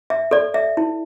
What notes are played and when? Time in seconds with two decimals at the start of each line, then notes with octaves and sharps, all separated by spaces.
0.10 E5
0.31 A4 D5
0.54 E5
0.77 E4